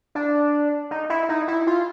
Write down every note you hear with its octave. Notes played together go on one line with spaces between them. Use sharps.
D4
D#4
E4
D#4
E4
F4